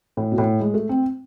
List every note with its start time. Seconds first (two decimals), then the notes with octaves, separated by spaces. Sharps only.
0.17 A2
0.32 B2
0.38 A2
0.60 G#3
0.74 A3
0.89 C4